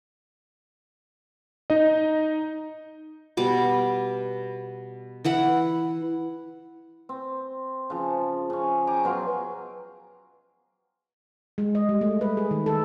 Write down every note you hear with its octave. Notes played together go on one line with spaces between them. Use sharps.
D#4 D#5
B2 G3 D6
E3 E4 F#5 B5
C4
C#3 F3
C#3 C#4
G5 G#5 A#5 D6
B2 F#3 F4 F5
G#3
D#5
G3
A3
B4
G#4
D#3
A4